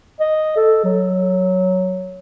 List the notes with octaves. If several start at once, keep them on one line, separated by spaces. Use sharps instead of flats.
D#5
A4
F#3